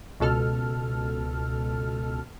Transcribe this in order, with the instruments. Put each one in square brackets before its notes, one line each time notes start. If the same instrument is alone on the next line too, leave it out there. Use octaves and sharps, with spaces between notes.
[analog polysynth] C#2 B2 A4 F6